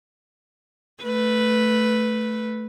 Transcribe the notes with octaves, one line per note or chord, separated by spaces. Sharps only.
A3 B4